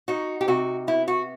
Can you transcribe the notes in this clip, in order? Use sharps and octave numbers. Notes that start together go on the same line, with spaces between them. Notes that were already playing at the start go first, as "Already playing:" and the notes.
D#4 F#4
G4
C3 F#4
B3 E4
F#4